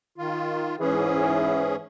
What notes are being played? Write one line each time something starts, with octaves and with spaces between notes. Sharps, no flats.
D#3 F4
G#2 E3 C#4 G#4